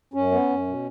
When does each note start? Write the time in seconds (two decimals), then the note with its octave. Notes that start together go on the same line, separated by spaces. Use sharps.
0.14 F#2 C#4
0.31 B3
0.50 F#2
0.67 B2